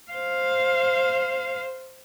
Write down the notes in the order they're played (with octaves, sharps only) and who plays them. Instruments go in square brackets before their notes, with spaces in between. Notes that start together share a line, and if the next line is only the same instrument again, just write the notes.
[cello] C5 F5